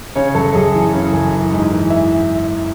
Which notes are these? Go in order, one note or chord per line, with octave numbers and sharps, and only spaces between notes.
C#3 C#5
F#2 A4
F#2 G#4
E3
C#3
F#2
E3
G#2
E3
E5